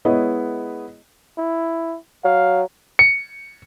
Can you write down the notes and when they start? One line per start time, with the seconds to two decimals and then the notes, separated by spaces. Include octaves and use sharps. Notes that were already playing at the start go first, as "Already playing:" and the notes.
0.05 G#3 B3 E4 B4 C#5 D#5
1.38 E4
2.24 F#3 F5
2.99 C#7